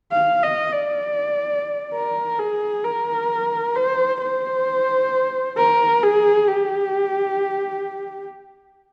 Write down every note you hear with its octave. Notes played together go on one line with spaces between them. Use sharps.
F5
D#5
D5
A#4
G#4
A#4
C5
C5
A#4
G#4
G4